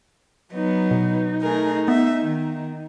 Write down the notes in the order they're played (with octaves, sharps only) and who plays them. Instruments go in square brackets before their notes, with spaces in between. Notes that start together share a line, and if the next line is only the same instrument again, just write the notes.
[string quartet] F#3 B3 [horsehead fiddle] D#4
[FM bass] B2
[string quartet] A3 G#4 A#4
[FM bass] B3 [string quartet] E5
[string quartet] D#3